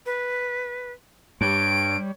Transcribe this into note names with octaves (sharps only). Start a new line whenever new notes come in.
B4
G2 G3 C#5 D7